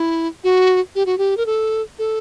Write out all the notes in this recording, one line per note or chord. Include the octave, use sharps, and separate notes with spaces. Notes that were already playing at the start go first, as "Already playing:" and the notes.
Already playing: E4
F#4
G4
F#4
G4
A#4
A4
A4